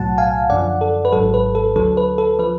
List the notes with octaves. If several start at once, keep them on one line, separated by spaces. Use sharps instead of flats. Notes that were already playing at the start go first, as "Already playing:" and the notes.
Already playing: B1 A2 F#3 F#5 A5
F5 G#5
F#2 D3 F3 D5 F#5
A4
B4
G#1 G#2 F#3 A4
B4
A4
D2 D3 F#3 A4
B4
A4
F3 B4